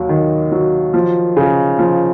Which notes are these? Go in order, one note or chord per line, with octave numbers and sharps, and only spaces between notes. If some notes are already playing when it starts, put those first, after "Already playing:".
Already playing: D#2 F#3
D#3
F#3
F3
C#3
F3